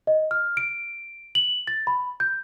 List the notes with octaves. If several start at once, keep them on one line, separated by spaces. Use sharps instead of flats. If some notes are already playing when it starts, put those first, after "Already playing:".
D#5
F6
D7
F#7
A6
B5
G6